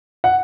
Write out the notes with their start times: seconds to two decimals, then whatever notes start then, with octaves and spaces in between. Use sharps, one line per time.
0.24 F#5